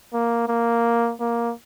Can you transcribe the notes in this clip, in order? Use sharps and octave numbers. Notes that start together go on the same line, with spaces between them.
A#3
A#3
A#3